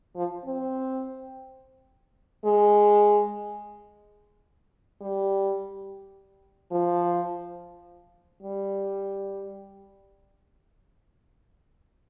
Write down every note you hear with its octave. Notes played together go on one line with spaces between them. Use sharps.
F3
C4
G#3
G3
F3
G3